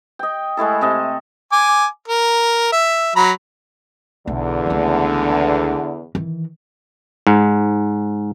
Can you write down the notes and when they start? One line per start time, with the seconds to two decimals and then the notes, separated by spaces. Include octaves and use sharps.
0.19 D#5 G5
0.57 G#3 A3 E4 A4
0.81 C3 D#5 A5
1.52 G#5 D6
2.08 A#4
2.72 E5
3.16 F#3 A#5 B5
4.27 B1 E2 D3
4.66 C#2 A3
6.15 D#3 E3
7.27 G#2